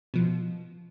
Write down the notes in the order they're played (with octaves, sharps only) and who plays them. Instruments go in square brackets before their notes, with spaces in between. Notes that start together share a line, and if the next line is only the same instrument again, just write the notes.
[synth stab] B2 F3